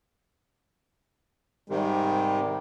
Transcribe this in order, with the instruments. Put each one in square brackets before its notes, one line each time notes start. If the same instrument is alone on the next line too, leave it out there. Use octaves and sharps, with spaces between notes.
[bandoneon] G#2 C3 D#3 [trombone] G3